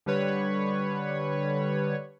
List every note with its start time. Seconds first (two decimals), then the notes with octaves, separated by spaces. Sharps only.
0.06 D3 G3 B4 C#5